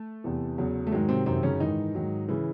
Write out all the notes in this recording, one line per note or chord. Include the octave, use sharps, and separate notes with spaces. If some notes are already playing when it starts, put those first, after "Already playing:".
Already playing: A3
E2 C3 E3
E2 C#3 F#3
A3
G#2 D#3 F#3 G#3
C3 C4
F#2 C3 D#3 F#3 C4
C#3 C#4
G#2 D#3 E3 D#4
G#2 D#3 F#3
C#3 E3 E4